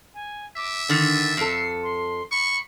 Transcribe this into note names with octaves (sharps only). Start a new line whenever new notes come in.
G#5
E5 D6
D3 D#3 A6
F2 A4 C7
C6
B5 C#6